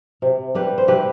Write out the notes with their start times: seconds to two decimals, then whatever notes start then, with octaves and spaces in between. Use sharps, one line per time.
0.22 C3
0.55 G3 G4 B4
0.78 C5
0.88 C3 G4 B4